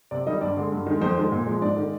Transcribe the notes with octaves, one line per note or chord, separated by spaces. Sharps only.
C3 D5
D#3 G3 D#5
G2 D5
D3 G#3
G2
D#3 G#3
F2 C5
D#3 G#3
A#2
F3 G#3
G#2 D5
D#3 G#3